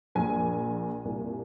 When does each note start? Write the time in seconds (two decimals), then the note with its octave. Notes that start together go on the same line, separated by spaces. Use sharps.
0.15 A#1 A#2 G#5
1.05 C2 A#2